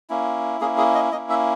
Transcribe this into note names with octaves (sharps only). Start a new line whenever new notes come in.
A#3 C#4 E4
A#3 C#4 E4 G#4
G#4
D#5
A#3 C#4 E4 D#5
E5